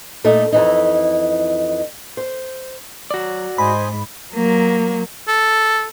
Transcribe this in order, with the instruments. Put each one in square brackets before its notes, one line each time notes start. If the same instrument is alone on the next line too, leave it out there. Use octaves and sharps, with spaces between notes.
[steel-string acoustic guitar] A#2 A3 D#4
F2 E3 D#4
C5
[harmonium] F#3 [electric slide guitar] F#4 D5
[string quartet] G#2 [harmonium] C5 D#5 G#5 [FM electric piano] B5
[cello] F#3 A#3
[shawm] A4